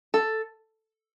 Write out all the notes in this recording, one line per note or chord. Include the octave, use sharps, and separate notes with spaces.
A4